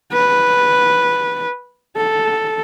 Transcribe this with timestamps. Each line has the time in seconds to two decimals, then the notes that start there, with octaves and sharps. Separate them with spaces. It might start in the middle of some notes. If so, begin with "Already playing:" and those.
0.13 B4
1.96 A4